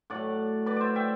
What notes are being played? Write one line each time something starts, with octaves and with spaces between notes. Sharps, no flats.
A2 F#3 A3 D5 F#5
B4 D5
C5 D5 E5
E5 G5